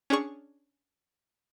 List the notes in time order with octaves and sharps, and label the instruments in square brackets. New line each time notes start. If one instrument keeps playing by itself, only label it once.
[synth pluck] C#4 D4 G#4 C#6